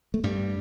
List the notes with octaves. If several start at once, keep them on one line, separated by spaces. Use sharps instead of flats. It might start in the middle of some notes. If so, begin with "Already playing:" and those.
A3
G2 G3